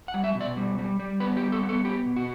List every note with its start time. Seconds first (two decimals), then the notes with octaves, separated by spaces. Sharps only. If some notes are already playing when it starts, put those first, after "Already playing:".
0.08 F#5
0.14 G3
0.24 E5
0.35 B2
0.41 D5
0.57 G3
0.78 G3
1.00 G3
1.20 B3 B4
1.37 G4
1.42 G3
1.52 A4
1.63 B3
1.69 A4
1.84 B3 G4
2.06 B2
2.16 F#4